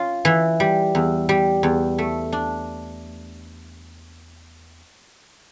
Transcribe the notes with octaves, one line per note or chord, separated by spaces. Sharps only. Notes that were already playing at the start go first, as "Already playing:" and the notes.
Already playing: C#4 F4
E3
G3
E2
G3
E2
A3
D4